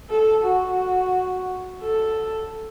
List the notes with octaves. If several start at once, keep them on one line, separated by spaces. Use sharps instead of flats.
A4
F#4
A4